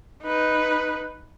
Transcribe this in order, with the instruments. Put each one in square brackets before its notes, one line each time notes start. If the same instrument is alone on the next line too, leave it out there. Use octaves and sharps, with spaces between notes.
[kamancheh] D#4 B4